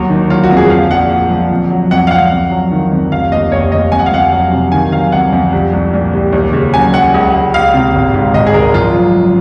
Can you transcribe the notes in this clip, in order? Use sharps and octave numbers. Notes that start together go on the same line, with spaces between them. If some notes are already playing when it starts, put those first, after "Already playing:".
Already playing: D#2 F#3
D#3
F#3 F4
F#4
F2
G#4
F3 F5
A#1 F#5
A#2
F3
F2
F#3
F2 F#5
F5
F2 F#5
F2
F#3
D#3
F2
F1 F5
D#2 D#5
F1 C#5
F1 D#5
F2 G#5
F#5
F5
F2 F#5
F#3
C3
D#3 G#5
F#3 F5
F2 F#5
F2
C2
C2
A#2
C2
D#2
C#3
F#3 G#5
F#3 F#5
C#2
C#2
C#2 F5
C3
G#1
G#2
G#1 D#5
G#4
G#1 A#4
F3 F4
F#2
F#2